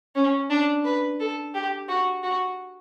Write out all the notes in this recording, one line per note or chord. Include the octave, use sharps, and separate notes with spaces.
C#4
D4
B4
A4
G4
F#4
F#4